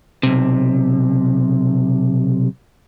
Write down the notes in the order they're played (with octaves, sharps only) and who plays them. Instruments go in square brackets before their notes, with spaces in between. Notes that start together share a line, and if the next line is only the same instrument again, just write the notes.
[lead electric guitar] B1 C3